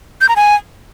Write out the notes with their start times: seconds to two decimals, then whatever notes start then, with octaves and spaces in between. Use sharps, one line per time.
0.21 G6
0.29 A#5
0.36 G#5